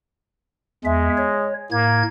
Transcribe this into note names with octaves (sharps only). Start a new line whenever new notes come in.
E2 G#3 E5
C#5
A2 A#3 G#6